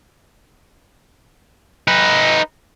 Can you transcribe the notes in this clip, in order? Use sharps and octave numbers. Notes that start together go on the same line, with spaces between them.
D#4 B4